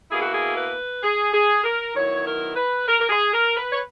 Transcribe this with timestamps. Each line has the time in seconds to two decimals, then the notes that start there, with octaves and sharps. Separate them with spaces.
0.11 B2 A#3 E4 G#4
0.22 F#4
0.33 G#4
0.56 B4
1.02 G#4
1.33 G#4
1.64 A#4
1.95 D#3 F#3 B3 E4 C#5
2.26 A#4
2.56 B4
2.87 A#4
3.00 A#4
3.09 G#4
3.33 A#4
3.56 B4
3.72 C#5